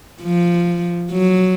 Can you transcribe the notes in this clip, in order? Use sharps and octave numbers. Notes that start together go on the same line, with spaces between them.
F3
F#3